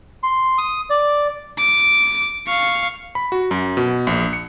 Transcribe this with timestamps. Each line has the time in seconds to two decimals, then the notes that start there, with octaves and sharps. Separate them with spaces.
0.23 C6
0.58 D#6
0.90 D5
1.58 D6
2.48 F5 C#6
3.15 B5
3.32 F#4
3.51 F#2
3.77 B2
4.07 A#1
4.33 C#7